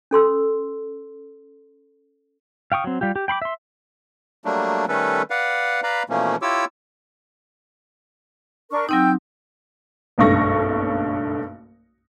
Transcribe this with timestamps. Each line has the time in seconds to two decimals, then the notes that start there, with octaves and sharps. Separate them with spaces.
0.11 C#4 A4 C6 E6
2.72 F5 G5 C#6 D#6
2.84 F#3 C4
3.01 G3 F4 G4
3.16 G4
3.28 G5 B5 C6 D6
3.42 E5 C6
4.45 F#3 G3 A3 A#3 D4
4.88 D#3 G3 A3 C#4 A4 B4
5.30 B4 D5 F5 F#5
5.83 B4 D5 F5 A#5 B5
6.09 B2 E3 F3 A3 A#3 C#4
6.42 E4 F4 G4 C#5 D6 E6
8.71 D4 A#4 C#6
8.89 F#3 C4 D#4 G5 E6 G6
10.18 F#1 B1 G2 A3 C#6 A#6